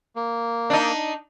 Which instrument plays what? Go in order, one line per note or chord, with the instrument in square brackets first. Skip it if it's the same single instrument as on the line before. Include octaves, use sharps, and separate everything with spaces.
[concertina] A#3
[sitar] D4 D#4